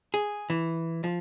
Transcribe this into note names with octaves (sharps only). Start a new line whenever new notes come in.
G#4
E3
F3